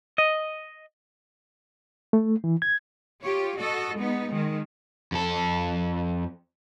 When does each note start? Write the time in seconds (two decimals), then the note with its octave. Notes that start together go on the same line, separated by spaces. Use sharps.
0.18 D#5
2.13 A3
2.44 E3
2.62 G#6
3.22 F4 G4 C#5
3.57 F#4 A4 D#5
3.97 G#3 B3 D#4
4.30 D#3 G#3
5.12 F2 A4